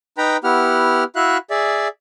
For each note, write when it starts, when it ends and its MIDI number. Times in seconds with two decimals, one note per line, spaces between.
0.18 0.37 63
0.18 0.37 71
0.18 0.37 79
0.18 0.37 82
0.18 0.37 83
0.44 1.04 59
0.44 1.04 64
0.44 1.04 67
0.44 1.04 78
0.44 1.04 89
1.16 1.37 64
1.16 1.37 66
1.16 1.37 76
1.16 1.37 77
1.16 1.37 90
1.50 1.88 68
1.50 1.88 74
1.50 1.88 76